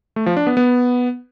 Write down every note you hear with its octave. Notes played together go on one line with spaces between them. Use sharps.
A3
F3
D4
B3
B3